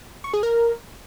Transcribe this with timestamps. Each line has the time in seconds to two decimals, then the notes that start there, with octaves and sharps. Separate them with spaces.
0.24 C#6
0.34 G#4
0.43 A#4